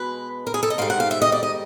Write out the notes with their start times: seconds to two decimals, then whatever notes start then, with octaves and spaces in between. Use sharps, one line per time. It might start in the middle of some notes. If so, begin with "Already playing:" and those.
Already playing: B2 G#3 B4
0.47 A#4
0.54 G#4
0.63 A4
0.70 D#5
0.78 G#2 D#3 G3 F5
0.90 F#5
1.00 F5
1.11 E5
1.22 D#5
1.32 D5
1.43 D#5